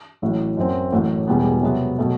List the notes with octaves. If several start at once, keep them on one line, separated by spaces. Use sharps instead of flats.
A1 A2 F#3
F#2 F#3 C4
A1 A2 F#3 A3
E1 E2 B2 G3 B3
C3 F#3 B3
B2 F#3 A3